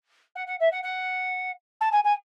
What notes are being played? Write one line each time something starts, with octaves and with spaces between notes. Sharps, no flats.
F#5
F#5
E5
F#5
F#5
A5
G#5
G#5